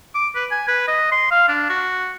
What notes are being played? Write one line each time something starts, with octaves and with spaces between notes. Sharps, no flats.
D6
B4
G#5
B4
D#5
C6
F5
D4
F#4